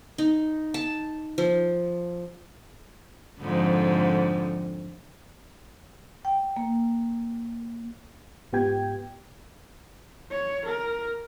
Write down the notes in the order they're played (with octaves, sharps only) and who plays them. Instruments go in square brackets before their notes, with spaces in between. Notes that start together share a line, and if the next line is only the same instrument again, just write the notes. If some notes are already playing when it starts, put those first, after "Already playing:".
[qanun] D#4
A5
F3
[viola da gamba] F2 G#2 D3
[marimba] G5
A#3
[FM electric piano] G#2 B3 F4 G4 G5 G#6
[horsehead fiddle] C#5
A#4